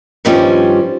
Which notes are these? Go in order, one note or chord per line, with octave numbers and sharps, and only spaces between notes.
G2 D#3 F3 G3 C4 C#4